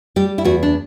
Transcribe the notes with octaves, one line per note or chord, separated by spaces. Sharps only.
G3 G4
E4
E2 F#4
D4